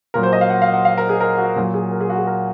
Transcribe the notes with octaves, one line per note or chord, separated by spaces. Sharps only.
A#2 F#3 A#4
C5
D#5
F5
F#5
F5
F#5
F5
A#4
G#4
A#4
F#4
A#2 F#3
G#4
A#4
G#4
F#4
G#4
A#4